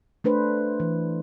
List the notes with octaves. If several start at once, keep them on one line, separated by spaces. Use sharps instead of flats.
A3 D4 B4 C5
E3